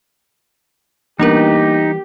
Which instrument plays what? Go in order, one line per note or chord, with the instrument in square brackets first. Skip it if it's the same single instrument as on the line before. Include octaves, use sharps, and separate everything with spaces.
[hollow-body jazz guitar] E3 G3 B3 [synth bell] A#3 D4 A#4 [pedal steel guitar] D#4 [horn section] G4